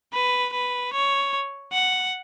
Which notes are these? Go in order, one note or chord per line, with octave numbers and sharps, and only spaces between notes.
B4
B4
C#5
F#5